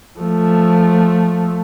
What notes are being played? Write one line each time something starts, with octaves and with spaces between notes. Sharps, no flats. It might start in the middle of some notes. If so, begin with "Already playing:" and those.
F3 A3